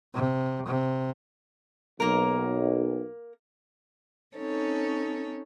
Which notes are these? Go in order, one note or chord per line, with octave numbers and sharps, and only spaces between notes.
C3
C3
B1 A#3 A#4
C4 C#4 D#4 A4 C#5